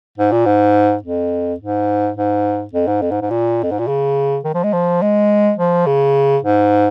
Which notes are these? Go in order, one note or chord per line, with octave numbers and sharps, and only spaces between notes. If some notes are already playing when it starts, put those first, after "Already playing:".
G#2
A#2
G#2
F2
G#2
G#2
F2
G#2
F2
G#2
G#2
A#2
F2
G#2
A#2
C#3
D#3
F3
G#3
F3
G#3
F3
C#3
G#2